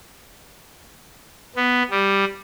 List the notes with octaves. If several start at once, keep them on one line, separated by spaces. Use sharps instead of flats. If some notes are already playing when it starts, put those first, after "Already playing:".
B3
G3